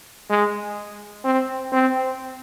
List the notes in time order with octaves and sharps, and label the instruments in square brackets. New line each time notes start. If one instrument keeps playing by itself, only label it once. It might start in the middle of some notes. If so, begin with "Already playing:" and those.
[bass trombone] G#3
C4
C4